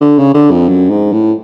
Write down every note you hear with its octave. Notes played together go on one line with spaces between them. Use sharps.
D3
C#3
D3
F2
F#2
G#2
A2